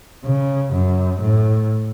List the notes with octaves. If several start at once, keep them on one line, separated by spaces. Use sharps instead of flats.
C#3
F#2
A2